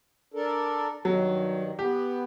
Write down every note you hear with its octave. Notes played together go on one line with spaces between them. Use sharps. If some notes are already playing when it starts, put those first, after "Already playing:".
D4 A4 A#4
G2 D#3 F#3
B3 G4